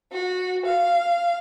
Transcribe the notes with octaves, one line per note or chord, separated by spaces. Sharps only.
F#4
F5